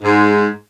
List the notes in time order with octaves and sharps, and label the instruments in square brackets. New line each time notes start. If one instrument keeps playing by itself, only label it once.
[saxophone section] G#2